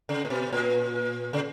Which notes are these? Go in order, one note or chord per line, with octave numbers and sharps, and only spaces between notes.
C#3
A#2
B2
A#2
C#3